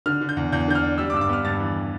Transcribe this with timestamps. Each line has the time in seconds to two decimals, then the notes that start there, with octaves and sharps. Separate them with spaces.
0.06 D3 F6
0.21 D3
0.29 G6
0.37 E2
0.52 E2 G6
0.68 D3 G6
0.75 F6
0.83 D4
0.98 G3 E6
1.10 D6
1.13 G2 E6
1.21 D6
1.29 B3 F6
1.45 G2 A6
1.60 E3